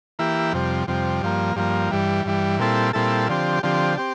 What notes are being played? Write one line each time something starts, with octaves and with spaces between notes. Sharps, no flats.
E3 A#3 E4 G4
F2 C3 G3
F2 C3 G3
G2 F3 A#3
G2 F3 A#3
G2 E3 G3
G2 E3 G3
A#2 G3 C4 E4 A4
A#2 G3 C4 E4 A4
D3 F3 C4 G4
D3 F3 C4 G4
C4 G4